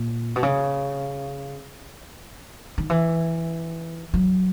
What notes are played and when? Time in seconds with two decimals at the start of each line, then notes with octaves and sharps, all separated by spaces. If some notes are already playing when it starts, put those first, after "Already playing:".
Already playing: A#2
0.36 B2
0.43 C#3
2.78 D#3
2.90 E3
4.14 F#3